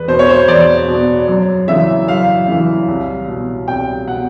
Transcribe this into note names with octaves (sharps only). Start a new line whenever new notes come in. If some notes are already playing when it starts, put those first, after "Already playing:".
Already playing: E2 B4
B2 C5
C#5
C5
E2 D5
B2
F#2
C#3 E3 E5
F#2 F5
C#3 E3
C2
B2
C2 G5
B2 F#5